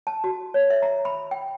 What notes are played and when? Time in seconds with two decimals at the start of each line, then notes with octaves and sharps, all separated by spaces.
0.07 A5
0.24 F#4
0.54 C#5
0.70 E5
0.82 A#5
1.05 B5
1.31 G5